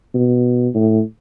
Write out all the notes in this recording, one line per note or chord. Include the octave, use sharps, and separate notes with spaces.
B2
A2